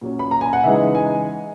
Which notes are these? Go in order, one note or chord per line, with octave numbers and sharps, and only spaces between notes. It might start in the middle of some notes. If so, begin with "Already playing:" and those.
A#2 F#3 C#4
B5
A#5
G#5
F#5
C#3 E3 G#3 D#4 E5
G#5